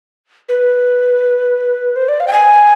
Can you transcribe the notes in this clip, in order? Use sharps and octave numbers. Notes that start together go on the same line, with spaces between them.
B4
C5
D5
F5
G5
G#5